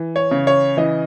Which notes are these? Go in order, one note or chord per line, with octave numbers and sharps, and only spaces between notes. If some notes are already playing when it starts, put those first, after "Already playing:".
Already playing: E3
C#5
C#3
C#5
E3 D#5